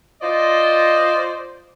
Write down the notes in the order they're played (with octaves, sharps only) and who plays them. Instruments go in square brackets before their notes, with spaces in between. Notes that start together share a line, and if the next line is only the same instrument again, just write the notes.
[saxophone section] F4 C5 D5 D#5